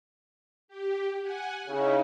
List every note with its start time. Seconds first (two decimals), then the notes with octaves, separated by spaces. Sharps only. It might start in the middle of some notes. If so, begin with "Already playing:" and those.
0.68 G4
1.22 F#5 G#5
1.68 C#3 D#4 E4